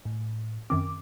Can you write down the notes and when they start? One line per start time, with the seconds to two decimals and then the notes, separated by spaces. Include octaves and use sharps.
0.05 A2
0.70 F#2 D#3 C4 D6